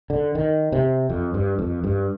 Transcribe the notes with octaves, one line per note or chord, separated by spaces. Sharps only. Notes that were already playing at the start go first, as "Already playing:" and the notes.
D3
D#3
C3
F2
G2
F2
G2